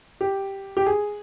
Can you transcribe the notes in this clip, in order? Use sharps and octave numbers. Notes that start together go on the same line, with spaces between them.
G4
G4
G#4